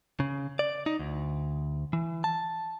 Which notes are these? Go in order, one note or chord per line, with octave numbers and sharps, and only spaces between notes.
C#3
D5
D#4
D2
E3
A5